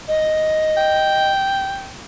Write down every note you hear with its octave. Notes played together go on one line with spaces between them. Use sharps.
D#5
G5